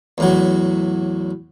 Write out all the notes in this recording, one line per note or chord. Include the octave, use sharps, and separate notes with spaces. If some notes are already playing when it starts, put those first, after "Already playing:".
E2 A2 F#3